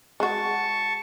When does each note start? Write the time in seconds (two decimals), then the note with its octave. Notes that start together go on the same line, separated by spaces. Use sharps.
0.20 G#3 F#4 A5 C#6